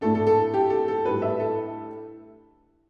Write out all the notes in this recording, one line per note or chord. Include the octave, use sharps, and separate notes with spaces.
A2 A3 D4 A4
A4
A4
G4
A4
A4
A2 G3 D4 B4
E5
A4